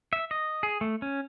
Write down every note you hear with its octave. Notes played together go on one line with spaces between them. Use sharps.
E5
D#5
G#4
A3
C#4